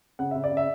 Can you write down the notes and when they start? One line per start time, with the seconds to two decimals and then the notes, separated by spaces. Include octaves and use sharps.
0.19 C#3 F#5
0.31 C#3 E5
0.44 D5
0.51 C#3
0.57 E5